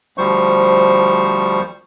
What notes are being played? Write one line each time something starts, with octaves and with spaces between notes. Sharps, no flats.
D2 F3 G3 C5 C#6